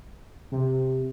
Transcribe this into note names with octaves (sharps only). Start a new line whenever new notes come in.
C3